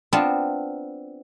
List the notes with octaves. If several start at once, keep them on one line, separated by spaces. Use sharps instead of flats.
B3 C4 D4 F4